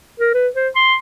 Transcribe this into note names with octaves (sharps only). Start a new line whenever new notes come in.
A#4
B4
C5
C6